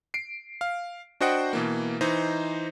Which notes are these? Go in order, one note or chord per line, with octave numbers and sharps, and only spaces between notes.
C7 D7
F5
D4 F#4 C5 D#5 F#5 G5
B2 E3 A#3
E3 D#4 C5 D#5